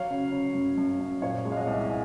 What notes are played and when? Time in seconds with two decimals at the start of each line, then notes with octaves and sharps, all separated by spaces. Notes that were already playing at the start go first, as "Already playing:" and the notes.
Already playing: F#3 C#5 F5
0.10 C#3
0.32 C#3
0.54 F#2
0.77 F#2
1.00 F#2
1.22 A#2 C#5 F5
1.45 G#3
1.52 F5
1.57 D#5 F#5
1.67 C2
1.90 F5 G#5